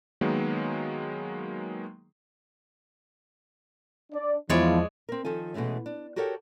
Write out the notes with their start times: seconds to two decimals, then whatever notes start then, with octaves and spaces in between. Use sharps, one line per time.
0.21 D#3 F#3 G#3 A#3 B3
4.13 D4 D5
4.50 E2 F3 G#3 E4 C#5 D5
5.09 C4 A#4
5.25 D#3 F3 A4 G#5
5.54 B2 E3 G#3 A3 C#4
5.86 D4
6.16 F#4 G4 A4 A#4 C#5 G5